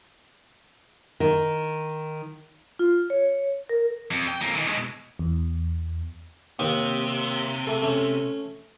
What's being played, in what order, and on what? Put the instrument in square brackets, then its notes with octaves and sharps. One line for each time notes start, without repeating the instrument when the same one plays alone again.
[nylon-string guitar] D#3
[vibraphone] F4
C#5
A#4
[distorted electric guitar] F2
G5
F2 A#3
D#3 E3
B2 G#3
[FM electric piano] E2
[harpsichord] D#2 [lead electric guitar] C3
[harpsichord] A3 A4
A3 C#4